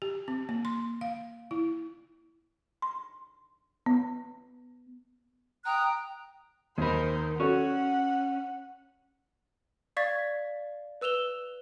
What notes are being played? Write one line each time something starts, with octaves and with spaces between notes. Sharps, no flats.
G4
C4
A#3
C6
F5
E4
C6
B3
G5 A#5 D#6 F#6
D#2 D#3 A#4 C5 B5
C#4 F#4 A4 C#5 F#5
D5 F5 C#6 G#6 A6 B6
B4 E6 E7 F7 G7